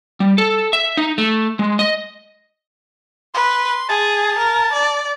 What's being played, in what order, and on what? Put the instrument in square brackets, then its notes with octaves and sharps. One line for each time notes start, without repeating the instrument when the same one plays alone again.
[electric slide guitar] G3
A4
E5
D#4
A3
G#3
D#5
[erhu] B4 [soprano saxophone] C6
[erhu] G#4 [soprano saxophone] A5
[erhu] A#4
D5